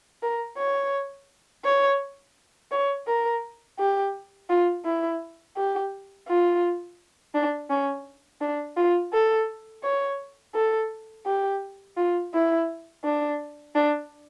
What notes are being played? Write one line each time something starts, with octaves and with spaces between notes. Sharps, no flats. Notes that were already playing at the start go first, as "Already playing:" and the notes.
A#4
C#5
C#5
C#5
A#4
G4
F4
E4
G4
F4
D4
C#4
D4
F4
A4
C#5
A4
G4
F4
E4
D4
D4